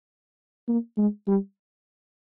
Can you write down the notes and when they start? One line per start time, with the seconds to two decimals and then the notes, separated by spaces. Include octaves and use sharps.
0.68 A#3
0.98 G#3
1.28 G3